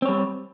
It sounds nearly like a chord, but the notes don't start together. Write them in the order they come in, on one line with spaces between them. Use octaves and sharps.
C4 C#5 G3